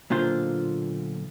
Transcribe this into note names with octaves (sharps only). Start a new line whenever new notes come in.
B1 A#2 D3 F4 C5